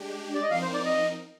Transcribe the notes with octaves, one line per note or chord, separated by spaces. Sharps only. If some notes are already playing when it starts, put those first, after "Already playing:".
Already playing: G#3 D4 G4
D5
D#5
F3 C4 D#4 A#4 F5
C5
D5
D#5